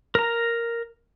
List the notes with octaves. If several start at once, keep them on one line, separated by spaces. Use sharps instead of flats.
A#4 A#5